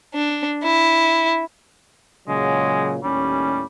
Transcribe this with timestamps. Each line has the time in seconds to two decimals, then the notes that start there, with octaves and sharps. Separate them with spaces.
0.14 D4
0.64 E4
2.28 A#2 C#3 F#3 G#3
3.03 D#2 A2 G3 C#4